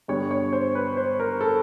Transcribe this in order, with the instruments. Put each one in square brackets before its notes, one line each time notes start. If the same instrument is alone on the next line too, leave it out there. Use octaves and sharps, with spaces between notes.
[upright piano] G2 D3 G3 B3 C#5
C#5
C5
B4
C5
A#4
A4